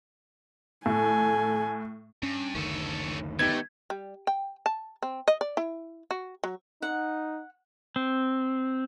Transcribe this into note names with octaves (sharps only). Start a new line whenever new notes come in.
A2 A4 G#5
G2 C#4
F#1 D2 D#3 C#4 A4
A3 B3 D#4 G4 A4 G#6
G3
G5
A5
C4
D#5
D5
E4
F#4
F#3
D#4 F#5
C4